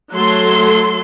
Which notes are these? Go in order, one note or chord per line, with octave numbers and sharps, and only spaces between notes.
F#3 A3 A4 C6